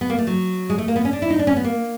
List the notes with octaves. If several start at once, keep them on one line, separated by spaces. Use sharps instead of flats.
B3
A#3
A3
F#3
G#3
A3
A#3
B3
C#4
D4
E4
D#4
D4
C#4
B3
A#3